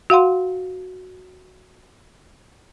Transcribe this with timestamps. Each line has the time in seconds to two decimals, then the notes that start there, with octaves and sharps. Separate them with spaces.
0.10 F#4 F5 F#5 C6